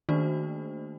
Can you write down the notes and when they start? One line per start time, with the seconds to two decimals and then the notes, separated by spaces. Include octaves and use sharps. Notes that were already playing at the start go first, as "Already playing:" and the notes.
0.09 D#3 A3 A#3 D4 F#4 C5